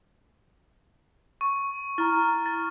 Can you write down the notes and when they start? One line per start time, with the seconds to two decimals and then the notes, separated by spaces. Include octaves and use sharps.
1.41 C#6
1.98 E4 A#5 F6 A6
2.46 A6